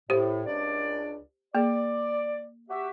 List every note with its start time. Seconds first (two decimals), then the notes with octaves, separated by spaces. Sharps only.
0.10 A2 G4 C5
0.46 C#2 D4 D5
1.55 A#3 G#4 D5
2.69 F#4 G4 E5